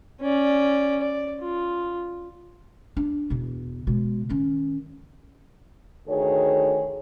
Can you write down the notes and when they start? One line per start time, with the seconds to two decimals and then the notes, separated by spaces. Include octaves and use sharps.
0.21 C#4 D5
1.01 D5
1.40 F4
2.97 D4
3.30 E2 B2
3.87 B2 G#3
4.29 D#3 C#4
6.07 D2 D#3 G#4 C#5